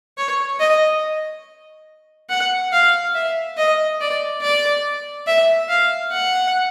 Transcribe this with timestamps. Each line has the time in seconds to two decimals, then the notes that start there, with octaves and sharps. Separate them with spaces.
0.18 C#5
0.60 D#5
2.30 F#5
2.72 F5
3.14 E5
3.57 D#5
4.00 D5
4.42 D5
5.27 E5
5.69 F5
6.11 F#5